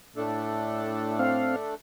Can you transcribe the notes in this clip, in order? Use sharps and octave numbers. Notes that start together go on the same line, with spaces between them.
A2 A3 D4 A4
C4 F5